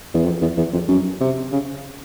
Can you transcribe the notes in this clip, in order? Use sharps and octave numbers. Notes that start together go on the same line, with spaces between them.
E2
F2
E2
E2
F2
F#2
C3
C#3